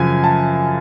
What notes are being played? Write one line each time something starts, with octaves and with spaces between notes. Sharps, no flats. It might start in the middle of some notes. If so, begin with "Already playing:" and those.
Already playing: F#2 C#3 F3 G#5
A5